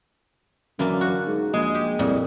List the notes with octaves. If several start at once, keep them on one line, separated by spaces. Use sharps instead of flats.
F#2 D3 E3 A#3
F#4
G#2
A#1 G#3
G4
C2 F2 A#2